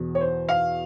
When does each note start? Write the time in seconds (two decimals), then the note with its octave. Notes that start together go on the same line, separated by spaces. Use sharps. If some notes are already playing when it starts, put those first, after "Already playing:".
Already playing: E2 B2
0.15 C#5
0.21 C5
0.49 F5